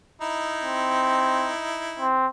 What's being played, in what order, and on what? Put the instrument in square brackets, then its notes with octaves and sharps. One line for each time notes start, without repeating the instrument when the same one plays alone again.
[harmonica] D#4 E4
[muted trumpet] C4
C4